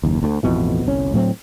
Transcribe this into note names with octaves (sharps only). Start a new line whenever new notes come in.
F#1 D#2
D2
A1 F2 B2 E3
G1 C2 C#4
D2 A2 F#3 C4